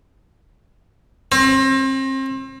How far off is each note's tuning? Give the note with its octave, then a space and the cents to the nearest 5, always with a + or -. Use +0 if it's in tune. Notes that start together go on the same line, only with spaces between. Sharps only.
C4 +35